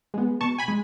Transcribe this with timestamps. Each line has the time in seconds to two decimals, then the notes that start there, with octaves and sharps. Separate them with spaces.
0.14 G#3 B3
0.41 B2 A5 C#6
0.58 G#5 B5
0.68 G#3